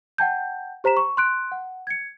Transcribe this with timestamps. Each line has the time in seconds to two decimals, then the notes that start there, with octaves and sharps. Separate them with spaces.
0.18 F#5 G5 A5 G6
0.84 G4 C5 A#5 B6 E7
0.97 C#6
1.17 C6 F#6 D7
1.52 F#5
1.87 G#6 C#7